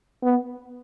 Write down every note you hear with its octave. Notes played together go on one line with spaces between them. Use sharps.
B3